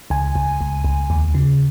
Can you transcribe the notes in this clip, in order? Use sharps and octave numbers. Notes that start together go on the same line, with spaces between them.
C#2 G#5
C#2
C#2
C#2
D#2
C#3